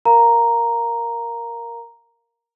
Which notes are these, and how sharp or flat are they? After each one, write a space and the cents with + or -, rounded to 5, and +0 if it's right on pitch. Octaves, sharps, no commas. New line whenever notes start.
A#4 +0 F5 +0 A#5 +0